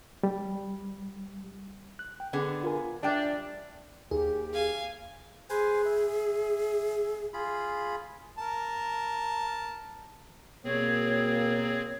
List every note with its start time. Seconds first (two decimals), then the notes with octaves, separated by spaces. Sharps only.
0.23 G3
1.99 F#6
2.20 G5
2.33 D3 B3 G#4
2.63 F4 A#4 G#5
3.03 G3 D4 D5 E5 G5
4.11 D#2 G4 G#4
4.53 F5 G#5
5.50 G#4 B4 C5 G#5
5.85 E5
7.34 F4 G#4 B5
8.38 A#4 A5
10.65 B2 G3 A#3 C4 G#4 C#5